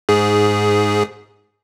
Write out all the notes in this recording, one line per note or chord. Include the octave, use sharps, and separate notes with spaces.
G#2 G#4